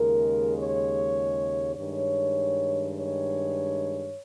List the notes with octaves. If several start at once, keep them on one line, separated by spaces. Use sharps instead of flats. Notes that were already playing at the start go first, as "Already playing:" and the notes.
Already playing: D#2 C#3 G#3 A#4
C#5
G2 D#3 G#3 C#5
C#5